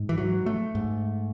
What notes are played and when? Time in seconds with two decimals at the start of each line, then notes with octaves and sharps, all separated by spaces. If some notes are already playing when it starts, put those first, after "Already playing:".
Already playing: G#2
0.09 E3
0.18 F#3
0.46 A3
0.75 G#2